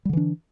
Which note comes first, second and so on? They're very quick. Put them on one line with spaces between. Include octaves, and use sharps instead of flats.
G3 D3 E3 D4